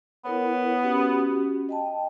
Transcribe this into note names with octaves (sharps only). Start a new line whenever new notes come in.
B3 E4 A#4 C#5
C#4 F#4 G4
D#5 G5 A5